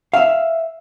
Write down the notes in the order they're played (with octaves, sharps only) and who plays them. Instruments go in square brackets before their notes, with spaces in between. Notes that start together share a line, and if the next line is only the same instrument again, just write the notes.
[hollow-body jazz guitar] E5 F5